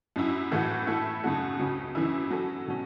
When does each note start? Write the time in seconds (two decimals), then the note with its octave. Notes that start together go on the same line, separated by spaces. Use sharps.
0.16 F#2 F#3 C#4 E4
0.51 A2 E3 A3 F#4
0.87 A2 A3 E4 A4
1.23 F#2 C#3 A3 F#4
1.59 C#2 C#3 F#3 C#4
1.95 F#2 E3 C#4 E4
2.31 F#3 C#4 A4
2.67 B2 F#3 C#4